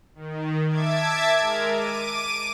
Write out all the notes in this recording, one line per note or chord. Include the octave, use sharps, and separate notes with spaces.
D#3
E5 A5 D6 G#6
G#3 A#4
D6 D#7